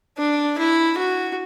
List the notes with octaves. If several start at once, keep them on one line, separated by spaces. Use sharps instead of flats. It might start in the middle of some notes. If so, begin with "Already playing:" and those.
D4
E4
F#4